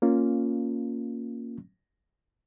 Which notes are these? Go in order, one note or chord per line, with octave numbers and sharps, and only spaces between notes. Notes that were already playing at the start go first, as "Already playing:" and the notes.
A#3 C#4 F4